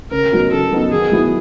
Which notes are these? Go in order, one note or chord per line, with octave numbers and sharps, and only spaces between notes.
C#3 A#4
F#3 B3 D#4 F#4
C#3 A4
F#3 B3 D#4 F#4
D#3 G#4
F#3 B3 E4